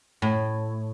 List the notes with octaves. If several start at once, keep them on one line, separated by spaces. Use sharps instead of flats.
A2